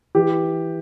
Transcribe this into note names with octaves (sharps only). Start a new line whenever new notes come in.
E3 G4